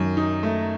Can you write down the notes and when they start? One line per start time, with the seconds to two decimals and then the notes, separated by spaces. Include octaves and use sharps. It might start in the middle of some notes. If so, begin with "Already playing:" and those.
Already playing: F#2 D#3
0.17 D#4
0.43 A3